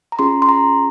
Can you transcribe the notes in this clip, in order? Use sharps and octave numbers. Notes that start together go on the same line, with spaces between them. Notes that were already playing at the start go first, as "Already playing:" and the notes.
A#5
C#4 F4 G#4 C6
C6
A#5